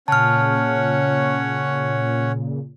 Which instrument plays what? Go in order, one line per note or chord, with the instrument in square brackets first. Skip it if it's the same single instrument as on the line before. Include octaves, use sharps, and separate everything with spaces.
[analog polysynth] A#2 C#3 [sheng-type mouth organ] C#4 C#5 F#5 [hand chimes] A5 F6